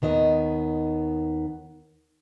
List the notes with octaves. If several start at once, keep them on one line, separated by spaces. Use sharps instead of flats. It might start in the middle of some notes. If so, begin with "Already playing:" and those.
D#2 D#3 B3 D#5